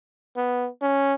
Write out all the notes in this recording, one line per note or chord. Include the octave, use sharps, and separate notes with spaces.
B3
C#4